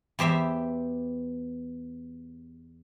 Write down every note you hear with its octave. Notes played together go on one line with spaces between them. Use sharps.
E2 G4 C5 E5